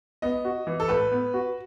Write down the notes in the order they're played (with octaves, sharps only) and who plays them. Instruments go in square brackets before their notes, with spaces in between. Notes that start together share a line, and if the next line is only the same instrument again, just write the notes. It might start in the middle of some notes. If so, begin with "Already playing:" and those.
[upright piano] B3 [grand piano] D#5
[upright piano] F#4
E3
[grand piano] A4
[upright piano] A2 [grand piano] B4
[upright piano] B3
F#4